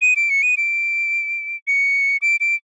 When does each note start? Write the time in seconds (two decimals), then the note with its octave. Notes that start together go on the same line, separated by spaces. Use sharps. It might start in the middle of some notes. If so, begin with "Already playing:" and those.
0.02 D#7
0.16 D7
0.30 C#7
0.43 D#7
0.57 D7
1.67 C#7
2.22 D7
2.40 D7